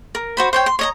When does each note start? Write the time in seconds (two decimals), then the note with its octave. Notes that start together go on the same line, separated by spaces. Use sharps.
0.15 A#4
0.37 F#4 C5 B5
0.53 C5 C#5 G5
0.66 C6
0.79 C#5 D#5 A#5